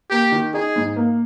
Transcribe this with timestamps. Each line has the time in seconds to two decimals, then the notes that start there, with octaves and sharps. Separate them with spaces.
0.10 A#3 G4
0.32 D#3
0.54 D#4 G#4
0.76 G#2
0.96 A#3